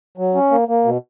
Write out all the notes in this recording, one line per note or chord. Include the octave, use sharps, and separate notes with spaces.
F#3
C#4
A#3
A#3
B2